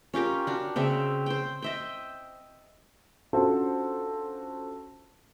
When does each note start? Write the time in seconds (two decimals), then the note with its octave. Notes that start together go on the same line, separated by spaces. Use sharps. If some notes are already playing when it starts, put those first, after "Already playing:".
0.14 C#4 F4 G4 A#4
0.47 D4 F#4
0.76 C#3 C4 D5 E5
1.26 C5 G5
1.62 D#5 E5 G5
3.33 C#4 D4 F4 F#4 A4 C5